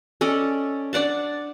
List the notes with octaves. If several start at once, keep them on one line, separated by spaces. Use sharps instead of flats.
C#4 A4 D5 D#5
D4 D5 F#5 A5